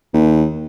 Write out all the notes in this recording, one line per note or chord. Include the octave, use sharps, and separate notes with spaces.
D#2